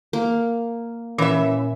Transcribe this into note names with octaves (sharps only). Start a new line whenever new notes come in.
A#3
A#2 E3 C#4 E5 B5